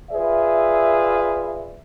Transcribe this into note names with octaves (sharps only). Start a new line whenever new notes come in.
F4 G#4 B4 D5 E5